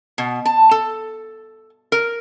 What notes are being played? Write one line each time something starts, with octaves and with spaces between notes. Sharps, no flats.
B2
A5
A4
A#4